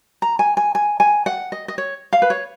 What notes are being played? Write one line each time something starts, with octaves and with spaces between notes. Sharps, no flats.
A#5
G#5
G#5
G#5
G#5
F#5
D#5
D#5
C#5
F5
B4
C#5